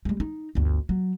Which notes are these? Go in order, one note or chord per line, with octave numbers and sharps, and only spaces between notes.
G3 G#3
D#4
G1 D2
F#3